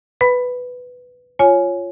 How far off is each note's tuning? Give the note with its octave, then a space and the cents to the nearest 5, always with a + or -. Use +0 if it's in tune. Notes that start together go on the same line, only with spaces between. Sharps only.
B4 +5 B5 +0
F4 -5 C#5 +0 G#5 +15